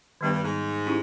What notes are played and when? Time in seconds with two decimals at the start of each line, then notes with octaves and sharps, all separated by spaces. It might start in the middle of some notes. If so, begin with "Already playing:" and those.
0.21 G2 D#3 G3 B3
0.32 G2
0.42 G#2
0.87 C#4 E4 G4